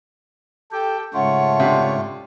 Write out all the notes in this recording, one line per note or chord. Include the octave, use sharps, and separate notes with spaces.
G4 A4 G5
G#2 C#3 A3 F4 C#5 F#5
C3 D4